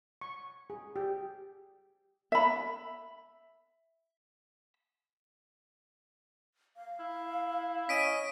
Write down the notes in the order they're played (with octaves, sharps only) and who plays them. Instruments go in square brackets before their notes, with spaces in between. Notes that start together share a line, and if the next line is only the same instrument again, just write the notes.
[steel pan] C#6
G#4
G4
[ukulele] E5 B5
[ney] F5
[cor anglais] E4
[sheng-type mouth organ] C#4 D#5 [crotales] B6 D7 D#7